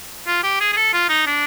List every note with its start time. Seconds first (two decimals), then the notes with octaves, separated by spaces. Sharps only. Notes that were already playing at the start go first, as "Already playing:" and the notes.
0.27 F4
0.43 G4
0.60 G#4
0.73 G#4
0.77 A4
0.93 F4
1.09 D#4
1.27 D4